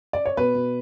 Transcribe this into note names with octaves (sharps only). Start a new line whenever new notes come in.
D5
C#5
B2 B4
B2